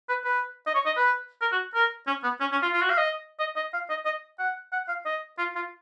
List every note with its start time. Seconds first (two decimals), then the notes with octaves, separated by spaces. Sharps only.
0.09 B4
0.25 B4
0.67 D#5
0.75 C#5
0.86 D#5
0.97 B4
1.41 A#4
1.52 F#4
1.75 A#4
2.07 C#4
2.23 B3
2.40 C#4
2.52 C#4
2.62 F4
2.73 F4
2.82 F#4
2.90 F5
2.98 D#5
3.39 D#5
3.56 D#5
3.73 F5
3.90 D#5
4.05 D#5
4.39 F#5
4.72 F#5
4.88 F5
5.05 D#5
5.38 F4
5.56 F4